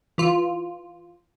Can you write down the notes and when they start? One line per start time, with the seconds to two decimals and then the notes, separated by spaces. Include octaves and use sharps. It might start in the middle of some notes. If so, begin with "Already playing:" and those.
0.18 E3 F4